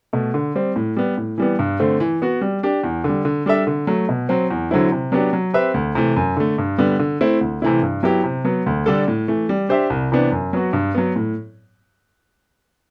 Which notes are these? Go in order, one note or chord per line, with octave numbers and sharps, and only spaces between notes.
B2 A3
D3
G3 C4
A2
G3 B3
A2
E3 G3 B3
G2
D3 A3 C4
E3
B3 F#4
G3
D4 G4
E2
D3 G3
D3
G3 D4 A4 E5
D3
F#3 A3
B2
F#3 C4
E2
D3 F#3 C4 E4
C3
F#3 B3 D4 G4
F#3
C4 G4 B4 E5
D2
C3 E3 A3
F#2
D3 A3
G2
D3 G3 B3
D3
A3 C4 E4
D2
C3 E3 A3 E4
G2
F#3 B3 E4 G4
C3
F#3 B3
D2
D3 G3 D4 A4
A2
E3 A3
G3
D4 G4 C5 E5
C2
C3 E3 B3 D4
F#2
F#3 B3 F#4
G2
F#3 B3
A2